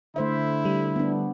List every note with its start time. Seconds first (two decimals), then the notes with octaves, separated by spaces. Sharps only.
0.16 D3 A3 E4 C5 E5
0.65 G3
0.96 B3 D4